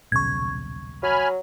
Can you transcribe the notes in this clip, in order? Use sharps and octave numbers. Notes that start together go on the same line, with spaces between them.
D#1 B1 C#3 C#6 G#6
F#3 G#5 B5 F6